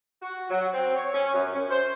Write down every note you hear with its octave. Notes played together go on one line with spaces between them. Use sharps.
F#4
F#3
C4
C#5
C#4
F#2
C#4
C5